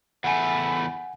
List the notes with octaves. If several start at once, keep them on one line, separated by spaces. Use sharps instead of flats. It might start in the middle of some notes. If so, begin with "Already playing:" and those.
E2 A3 F#5 G#5 B5